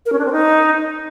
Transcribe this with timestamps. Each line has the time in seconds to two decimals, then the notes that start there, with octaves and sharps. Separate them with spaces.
0.06 A#4
0.12 C#4
0.19 D4
0.26 C4
0.32 D#4